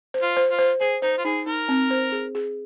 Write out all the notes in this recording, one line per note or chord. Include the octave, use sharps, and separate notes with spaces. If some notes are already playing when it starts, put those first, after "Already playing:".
C5
F4
C5
F4
C5
G#4 C5
D#4 C5
F4
D#4 G#4
D#4 A#4
C4
C5
G#4
G#4